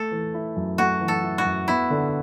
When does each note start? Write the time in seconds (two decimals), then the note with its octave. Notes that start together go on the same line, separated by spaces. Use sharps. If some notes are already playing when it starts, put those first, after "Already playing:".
Already playing: A3 A4
0.11 E3
0.34 E4
0.56 F#2
0.78 A3 F#4
1.01 E3
1.08 A4
1.23 E4
1.38 F#4
1.45 F#2
1.68 B3 E4
1.90 D3